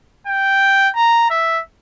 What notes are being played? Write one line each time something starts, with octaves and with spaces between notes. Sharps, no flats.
G5
A#5
E5